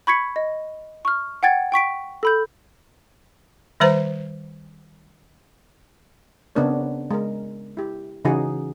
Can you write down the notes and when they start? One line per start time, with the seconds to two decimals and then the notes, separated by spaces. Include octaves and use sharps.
0.07 B5 C#6 G#6 B6 C#7
0.36 D#5
1.05 C#6 F6
1.43 F#5 G5 G#6 A6
1.72 G5 C#6 B6 D7
2.23 A4 B5 G6
3.80 D#3 G3 B4 C5 A#5
6.55 C#3 B3 C4 D4 A#4 C#5
7.11 G#3 A#4
7.77 E4 G4
8.25 C#3 E3 D#4 F#4 G#4